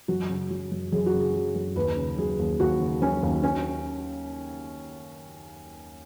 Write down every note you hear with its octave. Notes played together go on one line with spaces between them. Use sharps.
F#2 F#4
C#3
F#3
F#2
F#2 G#4
F#4
C#3
G#4
F#3
F#2
D#2 B4
C#3
F#3 G#4
D#2
D#2 F#4
C#3
F#3 C#4
D#2
C#4